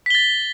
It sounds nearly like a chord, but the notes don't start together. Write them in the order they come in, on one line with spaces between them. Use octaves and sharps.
B6 G7 A6